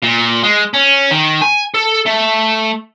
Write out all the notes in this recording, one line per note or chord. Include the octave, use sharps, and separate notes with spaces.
A#2
G#3
C#4
D#3
G#5
A4
A3